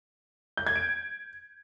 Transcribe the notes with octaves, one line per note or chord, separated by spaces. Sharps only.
G6
G#6
D7